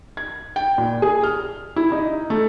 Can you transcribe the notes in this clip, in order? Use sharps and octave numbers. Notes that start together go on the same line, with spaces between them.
G#6
G5
A#2
G#4
F6
E4
D#4
A3